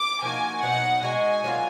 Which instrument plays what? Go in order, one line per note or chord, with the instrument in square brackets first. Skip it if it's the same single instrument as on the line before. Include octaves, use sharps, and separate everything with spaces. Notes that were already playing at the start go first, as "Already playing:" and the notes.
Already playing: [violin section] D6
[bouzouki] F3 A#3 D#4 F#4 [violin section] G#5
[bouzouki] B2 F#3 B3 D#4 [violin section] F#5
[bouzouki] G#3 D#4 F#4 [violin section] G#5
[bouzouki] F#3 A#3 D4 F4